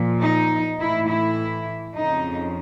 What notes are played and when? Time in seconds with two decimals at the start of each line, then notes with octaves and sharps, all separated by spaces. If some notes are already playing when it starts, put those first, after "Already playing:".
Already playing: A#2 F3
0.22 D#4
0.79 A2 E3 E4
1.08 E4
1.94 F2 C#3 F3 D#4